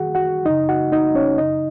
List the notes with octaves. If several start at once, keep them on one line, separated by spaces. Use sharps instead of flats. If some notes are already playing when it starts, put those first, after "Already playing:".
Already playing: F#2 D#3 F#4 G#4 F#5
F#4 F#5
F#2 C#3 D#4 D#5
F#4 F#5
D#4 D#5
C#4 C#5
F#2 C#3 D#4 D#5